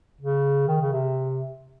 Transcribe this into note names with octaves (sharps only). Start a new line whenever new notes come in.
C#3
D#3
C#3
C3